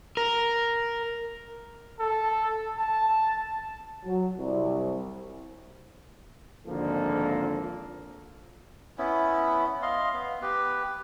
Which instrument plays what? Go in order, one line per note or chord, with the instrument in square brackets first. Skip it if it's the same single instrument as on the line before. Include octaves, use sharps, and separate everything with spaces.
[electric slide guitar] A#4
[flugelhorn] A4
A5
[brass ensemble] F#3
C2
[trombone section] G#1 D3 F3 A#3 F4 A4
[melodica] B3 C#4 E4
D#5 F5 C6
B3
G4 B4